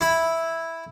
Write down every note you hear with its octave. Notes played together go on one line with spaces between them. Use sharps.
E4 B5